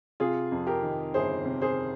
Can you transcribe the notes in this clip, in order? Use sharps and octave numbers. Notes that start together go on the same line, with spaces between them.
C3 F4 G#4
F2
G4 A#4
D#3
G1 G#4 C5
C3
G#4 C5